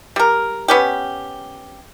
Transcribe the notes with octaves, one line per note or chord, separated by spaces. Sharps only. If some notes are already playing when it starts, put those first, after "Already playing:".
G3 A#4
B3 C#4 G4